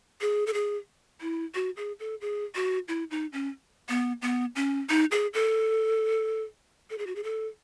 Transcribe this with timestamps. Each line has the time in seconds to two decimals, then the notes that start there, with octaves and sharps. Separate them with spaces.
0.21 G#4
0.47 A4
0.54 G#4
1.21 E4
1.55 F#4
1.77 G#4
1.99 A4
2.21 G#4
2.55 F#4
2.88 E4
3.11 D#4
3.33 C#4
3.89 B3
4.22 B3
4.56 C#4
4.90 D#4
5.11 G#4
5.34 A4
6.90 A4
6.98 G#4
7.07 F#4
7.16 G#4
7.24 A4